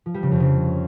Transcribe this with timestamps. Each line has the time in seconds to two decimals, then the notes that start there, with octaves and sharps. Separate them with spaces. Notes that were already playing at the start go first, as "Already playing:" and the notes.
0.06 F3
0.14 G3
0.23 C#3
0.31 F2
0.40 C#3